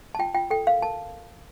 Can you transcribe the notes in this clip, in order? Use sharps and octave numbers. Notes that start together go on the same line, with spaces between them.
A5
F4 G5
F4 G5
A4 G5
A#4 F5
A#4 A5